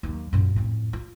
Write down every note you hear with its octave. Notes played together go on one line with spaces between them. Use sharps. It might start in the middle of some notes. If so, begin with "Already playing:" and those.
D#2 F#3
F#2 A#2
F2 A2
F4